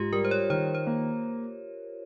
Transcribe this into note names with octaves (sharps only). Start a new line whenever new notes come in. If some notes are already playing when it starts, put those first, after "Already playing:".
Already playing: G#2 F4 G4
G3 A#4
C5
C#5
D#3 C5
C5
A#3